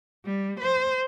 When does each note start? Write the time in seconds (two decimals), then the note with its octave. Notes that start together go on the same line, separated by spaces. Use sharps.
0.25 G3
0.60 C5